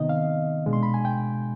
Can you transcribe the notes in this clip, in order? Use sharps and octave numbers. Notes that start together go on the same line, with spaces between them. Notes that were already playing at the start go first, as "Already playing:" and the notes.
Already playing: C3 D#3 B3 D#4 D#5
F5
B2 G#3 D4
C6
B5
G#5
G5